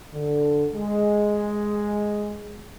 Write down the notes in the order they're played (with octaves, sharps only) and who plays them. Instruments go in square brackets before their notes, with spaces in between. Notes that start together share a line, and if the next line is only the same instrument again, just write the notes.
[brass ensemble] D3
G#3